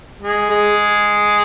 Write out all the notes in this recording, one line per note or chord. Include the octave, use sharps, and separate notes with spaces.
G#3
G#3